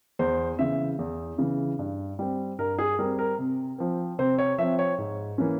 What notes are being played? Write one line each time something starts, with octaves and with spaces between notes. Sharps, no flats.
E2 C5
C#3 E3 E5
E2
C#3 E3
G2
G3 C4
G2 A#4
G#4
G3 C4 A#4
A#4
C3
F3 C4
C3 C5
C#5
F3 C4 E5
C#5
G#2
E3 A#3 C#4